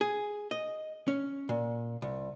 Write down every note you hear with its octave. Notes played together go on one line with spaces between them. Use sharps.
G#4
D#5
C#4
A#2
C2